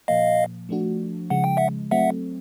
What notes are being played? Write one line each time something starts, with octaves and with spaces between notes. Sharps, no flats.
A#2 F3 A#3 D#5 F5
F3 A3 D4 F#4
C#3 F3 G#3 F#5
G5
E5 F#5
F#3 A3 C4 E5 F#5